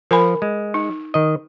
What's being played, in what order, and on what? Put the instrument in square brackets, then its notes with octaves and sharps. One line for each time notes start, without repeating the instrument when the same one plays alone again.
[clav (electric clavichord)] F3 [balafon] A#4 G#5 B5
[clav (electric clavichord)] G#3
[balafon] D#4
[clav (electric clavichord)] D#3 D#5